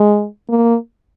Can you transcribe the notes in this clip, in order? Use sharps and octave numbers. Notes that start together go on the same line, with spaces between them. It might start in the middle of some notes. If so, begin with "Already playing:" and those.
Already playing: G#3
A#3